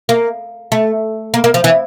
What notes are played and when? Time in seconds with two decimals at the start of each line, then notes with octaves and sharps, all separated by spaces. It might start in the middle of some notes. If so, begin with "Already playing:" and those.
0.09 A#3
0.72 A3
1.34 A#3
1.44 A#3
1.54 F3
1.64 E3